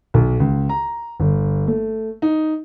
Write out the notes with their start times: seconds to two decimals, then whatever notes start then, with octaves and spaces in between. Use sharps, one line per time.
0.14 B1
0.40 C#2
0.69 A#5
1.20 G1
1.67 A3
2.22 D#4